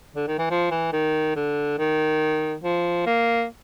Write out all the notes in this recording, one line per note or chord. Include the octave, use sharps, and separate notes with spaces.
D3
D#3
E3
F3
E3
D#3
D3
D#3
F3
A#3